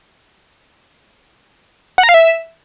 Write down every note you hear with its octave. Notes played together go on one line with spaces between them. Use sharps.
F#5
A#5
F5
E5